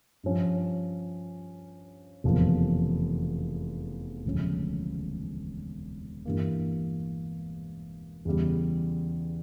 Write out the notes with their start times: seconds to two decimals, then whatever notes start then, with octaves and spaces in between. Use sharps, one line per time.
0.24 G2 F3 C#4
2.24 F1 E2 C#3 F3 A#3
4.25 E1 D2 C#3 F3 C#4
6.26 G2 E3 G3 A#3
8.25 E2 C#3 G3